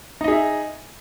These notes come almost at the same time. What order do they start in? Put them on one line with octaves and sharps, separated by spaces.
D#4 D#5 G#4 E5